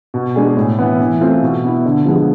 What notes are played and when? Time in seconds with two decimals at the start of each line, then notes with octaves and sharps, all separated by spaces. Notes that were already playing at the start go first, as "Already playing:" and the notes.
0.14 B2
0.36 G#3 D4 G#4
0.57 A2
0.78 E3 B3 E4
1.00 E3
1.21 A3 C4 F4
1.43 B2
1.64 B3 E4
1.85 D3
2.05 F3 G#3 B3